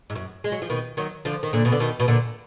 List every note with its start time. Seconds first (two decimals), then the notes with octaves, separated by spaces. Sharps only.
0.10 G#2
0.15 F#2
0.44 G#3
0.52 F#3
0.62 F3
0.70 B2 D#3
0.97 D#3 F#3
1.25 D3 F3
1.43 D#3
1.53 A#2 D3
1.65 B2
1.72 D3
1.80 B2 D#3
2.00 B2
2.08 A#2 D3